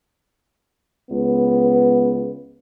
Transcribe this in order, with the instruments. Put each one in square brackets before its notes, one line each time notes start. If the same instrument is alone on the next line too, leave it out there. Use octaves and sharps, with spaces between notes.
[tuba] C#2 [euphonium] B3